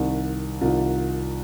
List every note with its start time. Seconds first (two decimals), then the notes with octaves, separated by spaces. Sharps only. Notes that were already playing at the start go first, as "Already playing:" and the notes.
Already playing: C2 C3 D#3
0.61 C2 C3 D#3 F4